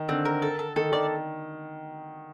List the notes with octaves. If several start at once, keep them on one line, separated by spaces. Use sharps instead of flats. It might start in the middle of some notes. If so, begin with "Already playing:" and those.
Already playing: D#3
D3 C4
A#4
A4
A4
D#3 A4
D#3 D5